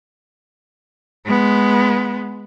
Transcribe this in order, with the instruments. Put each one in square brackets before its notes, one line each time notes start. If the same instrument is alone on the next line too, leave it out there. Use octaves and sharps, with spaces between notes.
[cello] G#3 B3